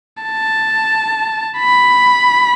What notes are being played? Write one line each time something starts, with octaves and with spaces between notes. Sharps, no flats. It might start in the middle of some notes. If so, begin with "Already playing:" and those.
A5
B5